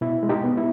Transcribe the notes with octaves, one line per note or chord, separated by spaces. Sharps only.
B2 E4
G#3
D#4 G4
B3
E4